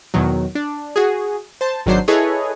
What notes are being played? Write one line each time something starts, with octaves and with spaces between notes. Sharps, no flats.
E2 B2 D#3 F#3
D4
F#4 G#4
C5 A5
G#1 D#3 F#3 D4 C5 C7
E4 G#4 A4 B4 C#5 D#5